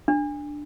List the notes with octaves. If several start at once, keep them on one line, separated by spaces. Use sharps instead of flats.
D4